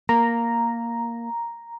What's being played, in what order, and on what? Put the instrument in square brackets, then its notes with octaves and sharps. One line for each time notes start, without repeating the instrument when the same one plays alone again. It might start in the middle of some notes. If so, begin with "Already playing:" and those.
[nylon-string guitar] A#3 [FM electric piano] A#5